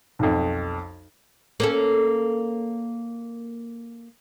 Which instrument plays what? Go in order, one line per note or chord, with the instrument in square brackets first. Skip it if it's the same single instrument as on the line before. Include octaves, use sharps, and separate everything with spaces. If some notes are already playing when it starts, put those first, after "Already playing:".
[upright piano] B1 F2
[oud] A#3 C#4 A4